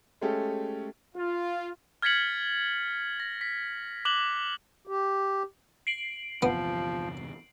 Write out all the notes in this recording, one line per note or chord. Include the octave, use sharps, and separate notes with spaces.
G#3 A3 C#4 G4 A4
F4
F6 G#6 A6 B6 C#7 F#7
A#6
B6
D6 F#6 F#7 G7
G4
C7 D7 F#7
G1 E2 C3 F3 B3